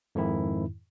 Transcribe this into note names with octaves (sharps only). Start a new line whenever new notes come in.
F2 G#2 D#3 E4